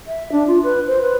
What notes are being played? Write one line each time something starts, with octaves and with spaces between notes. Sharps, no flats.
E5
D4
F4
B4
C5
B4